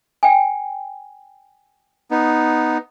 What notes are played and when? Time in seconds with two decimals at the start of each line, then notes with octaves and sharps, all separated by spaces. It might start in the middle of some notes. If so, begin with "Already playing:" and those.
0.23 G5 G#5
2.11 B3 D#4